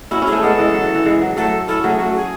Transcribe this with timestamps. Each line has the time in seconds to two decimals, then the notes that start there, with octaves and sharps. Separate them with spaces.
0.11 C#4 E4 F#4
0.22 C#4 E4 G#4
0.32 A3 C#4
0.43 G#3 B3 A4
0.58 E3 G#3
0.74 F#3
0.84 E3
0.95 E3
1.05 E3 G#3
1.21 F#3
1.37 F#3 A3 A4
1.68 C#4 E4 A4
1.84 F#3 A3 G#4
1.99 F#3 A3 F#4
2.16 G#4